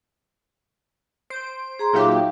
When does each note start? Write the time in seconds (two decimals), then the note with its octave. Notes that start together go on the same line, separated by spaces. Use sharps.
1.30 C5 D7
1.79 G#4 A#5 C6
1.93 A#2 F#3 D#4 G4 E5 F5